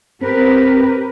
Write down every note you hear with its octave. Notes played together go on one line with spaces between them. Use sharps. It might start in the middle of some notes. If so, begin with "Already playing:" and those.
C4 G4 A#4 B4